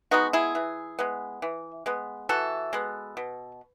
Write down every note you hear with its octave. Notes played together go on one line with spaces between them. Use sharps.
G#3 B3 D#4 F#4
E4 G#4
E3
G#3 B3
E3
G#3 B3
E3 F#4 A4
G#3 B3
B2